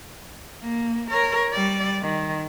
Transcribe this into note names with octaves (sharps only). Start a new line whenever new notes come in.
A#3
A#4 C#5
G3 D5
D#3